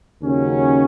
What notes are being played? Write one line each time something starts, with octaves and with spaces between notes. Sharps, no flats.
D#2 C#3 F#3 C#4